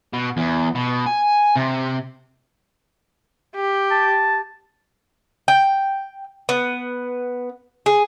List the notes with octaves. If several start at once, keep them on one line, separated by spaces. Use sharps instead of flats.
B2
E2
B2
G#5
C3
G4
A5
G5
B3
G#4